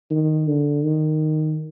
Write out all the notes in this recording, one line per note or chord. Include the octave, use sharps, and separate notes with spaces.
D#3
D3
D#3